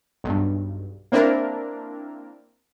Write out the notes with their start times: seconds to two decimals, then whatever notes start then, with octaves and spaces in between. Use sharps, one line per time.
0.24 B1 G2
1.12 A#3 C4 D4 E4 A#4